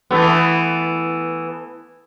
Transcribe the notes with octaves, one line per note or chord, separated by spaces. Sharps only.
E3 A3 B3